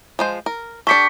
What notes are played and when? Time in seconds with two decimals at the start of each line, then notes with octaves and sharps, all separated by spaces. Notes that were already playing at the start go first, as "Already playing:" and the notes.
0.19 F3 G#3 C5
0.46 A#4
0.87 D4 G4 A4 C#6 B6 C#7